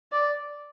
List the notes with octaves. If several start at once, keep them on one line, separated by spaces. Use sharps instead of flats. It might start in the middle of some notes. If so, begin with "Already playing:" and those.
D5